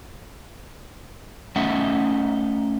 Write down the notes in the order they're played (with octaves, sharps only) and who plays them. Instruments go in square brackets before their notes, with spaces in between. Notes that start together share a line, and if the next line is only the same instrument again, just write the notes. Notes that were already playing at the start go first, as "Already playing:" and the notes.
[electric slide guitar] A3 C#4 D#4 E5 F#5